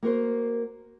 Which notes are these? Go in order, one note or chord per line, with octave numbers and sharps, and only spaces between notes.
A#3 F#4 A#4 C5